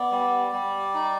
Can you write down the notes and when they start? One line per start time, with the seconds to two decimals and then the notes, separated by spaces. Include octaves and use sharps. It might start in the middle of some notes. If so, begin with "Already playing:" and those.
Already playing: B3 D5
0.11 G3
0.52 G3
0.94 D#4